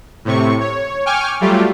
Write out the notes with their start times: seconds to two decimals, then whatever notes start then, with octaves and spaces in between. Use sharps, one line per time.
0.25 A2 C3 C#6
0.60 C#5
1.06 G5 G#5 C#6 D6 F6
1.41 F#3 G3 A3 F4 G4